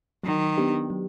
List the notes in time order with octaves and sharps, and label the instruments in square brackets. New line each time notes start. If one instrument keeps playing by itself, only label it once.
[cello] D#3 [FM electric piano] F#3
[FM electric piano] B3 D4 G4
F#3